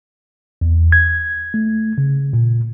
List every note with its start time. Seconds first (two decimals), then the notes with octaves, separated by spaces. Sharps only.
0.61 E2
0.92 G#6
1.54 A3
1.98 C#3
2.33 A#2